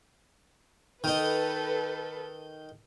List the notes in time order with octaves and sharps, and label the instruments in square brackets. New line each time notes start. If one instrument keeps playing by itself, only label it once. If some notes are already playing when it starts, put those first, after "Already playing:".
[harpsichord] D#3 D#4 [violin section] A4 B4